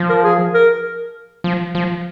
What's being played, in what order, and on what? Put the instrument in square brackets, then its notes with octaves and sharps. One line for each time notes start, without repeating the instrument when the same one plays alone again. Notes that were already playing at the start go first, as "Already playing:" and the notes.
Already playing: [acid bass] F3
[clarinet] A#4
G#4
A#4
[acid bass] F3
F3